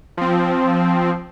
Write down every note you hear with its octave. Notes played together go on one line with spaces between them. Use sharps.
F3 C4